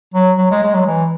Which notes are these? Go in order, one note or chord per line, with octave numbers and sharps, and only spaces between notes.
F#3
F#3
G#3
G#3
F#3
E3